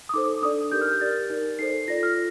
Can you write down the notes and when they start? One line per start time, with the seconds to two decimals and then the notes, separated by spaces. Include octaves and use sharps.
0.09 D#6
0.14 D#4 A4 C5 D6
0.42 D4 A4 D5 D#6
0.72 D#4 G4 A#4 G6
0.81 F6
0.92 G6
1.01 G4 A#4 D5 A6
1.30 D#4 A#4 D5
1.59 D#4 A4 C5 C7
1.88 F4 A4 D5 A#6
2.03 F6